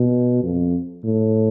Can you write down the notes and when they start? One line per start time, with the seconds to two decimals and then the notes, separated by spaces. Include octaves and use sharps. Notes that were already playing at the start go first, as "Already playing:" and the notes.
Already playing: B2
0.43 F2
1.04 A2